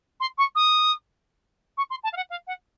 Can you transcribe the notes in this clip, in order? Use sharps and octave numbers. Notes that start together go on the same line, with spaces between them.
C6
C#6
D#6
C#6
C6
A5
F5
F#5
F5
F#5